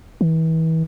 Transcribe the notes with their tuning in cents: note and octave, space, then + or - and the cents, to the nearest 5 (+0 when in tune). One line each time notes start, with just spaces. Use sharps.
E3 -35